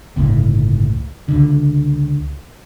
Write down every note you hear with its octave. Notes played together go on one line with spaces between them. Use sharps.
G1 C#2 A2
C#2 D3